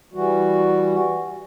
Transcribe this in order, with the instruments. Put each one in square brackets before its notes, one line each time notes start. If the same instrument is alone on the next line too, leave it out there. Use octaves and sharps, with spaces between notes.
[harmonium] E3 G3 F#4